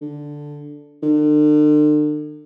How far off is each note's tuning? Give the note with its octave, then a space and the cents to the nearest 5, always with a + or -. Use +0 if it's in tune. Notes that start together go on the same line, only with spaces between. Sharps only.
D3 +0
D3 +40